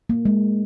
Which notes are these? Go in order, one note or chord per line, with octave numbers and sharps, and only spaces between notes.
A#3
G#3